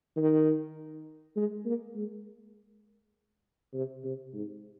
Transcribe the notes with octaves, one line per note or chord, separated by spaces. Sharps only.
D#3
G#3
A#3
G#3
C3
C3
G#2